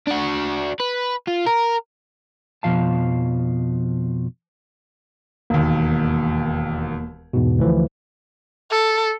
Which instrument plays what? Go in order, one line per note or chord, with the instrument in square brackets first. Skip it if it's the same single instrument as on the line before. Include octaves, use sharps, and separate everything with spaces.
[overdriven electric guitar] D4 F#4
B4
F4
A#4
[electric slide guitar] F2 B2 F3 F5 A5
[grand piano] E1 D#2 [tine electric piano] A#3
[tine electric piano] E2 G#2 B2
D2 E3 F3
[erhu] A4